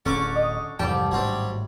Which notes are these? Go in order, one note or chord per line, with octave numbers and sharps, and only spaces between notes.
D1 D3 C#4 D5 C#6 D6
D#5
C2 F2 G#2 E3 G3 G4 G5 A5
G#1 A2 F#3 C4 D4